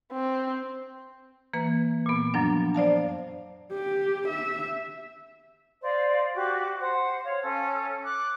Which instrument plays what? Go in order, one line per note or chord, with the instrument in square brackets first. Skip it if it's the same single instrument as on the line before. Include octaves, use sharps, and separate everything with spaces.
[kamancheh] C4
[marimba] E3 A#3 B4
A#2 B3
F#2 F3 F#3 D4
C5 D5 F5 A5
[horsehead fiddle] G4
E5
[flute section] C5 D5 D#5 F5
F#4 G4 D6
C5 F#5
C#5 F5
C#4 A4
D6 F#6